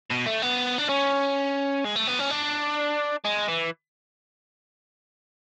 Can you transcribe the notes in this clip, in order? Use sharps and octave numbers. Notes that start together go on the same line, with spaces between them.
B2
A3
B3
D4
C#4
G#3
A3
B3
C#4
D4
G#3
E3